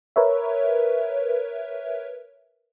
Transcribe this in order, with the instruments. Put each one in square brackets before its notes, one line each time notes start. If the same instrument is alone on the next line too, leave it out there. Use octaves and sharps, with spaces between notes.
[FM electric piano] A#4 B4 C#5 E5